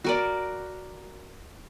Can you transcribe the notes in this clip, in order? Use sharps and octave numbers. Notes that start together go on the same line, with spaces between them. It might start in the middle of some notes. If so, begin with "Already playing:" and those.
F#4 A#4 D5